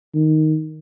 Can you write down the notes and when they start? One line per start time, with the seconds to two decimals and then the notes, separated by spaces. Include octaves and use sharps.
0.14 D#3